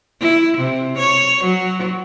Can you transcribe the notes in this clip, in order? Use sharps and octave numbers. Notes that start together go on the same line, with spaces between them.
E4
C3
C#5
F#3